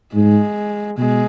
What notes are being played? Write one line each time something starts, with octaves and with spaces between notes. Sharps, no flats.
G#2 G#3
B2 G#3